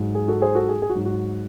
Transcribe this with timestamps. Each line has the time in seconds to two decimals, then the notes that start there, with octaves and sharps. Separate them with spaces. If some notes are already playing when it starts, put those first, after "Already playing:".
Already playing: G#2 F#3
0.15 G#4
0.28 F#4 A4
0.42 G#4 C5
0.55 F#4 A4
0.69 G#4
0.82 G#4
0.89 F#4
0.95 G#2 F#3
1.05 F#4